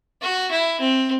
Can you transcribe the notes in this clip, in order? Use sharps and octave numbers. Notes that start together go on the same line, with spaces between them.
F#4
E4
C4